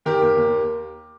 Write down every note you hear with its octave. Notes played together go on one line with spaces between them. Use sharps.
D#3 G4 A#4
D#2
D#2